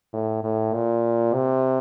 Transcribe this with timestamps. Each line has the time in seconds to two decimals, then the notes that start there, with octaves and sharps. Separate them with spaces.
0.13 A2
0.43 A2
0.74 A#2
1.33 C3